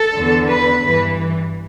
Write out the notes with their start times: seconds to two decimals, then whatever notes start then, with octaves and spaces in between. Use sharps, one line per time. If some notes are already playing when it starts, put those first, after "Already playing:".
Already playing: A4
0.16 E2 D3
0.49 B4
0.81 G2 E3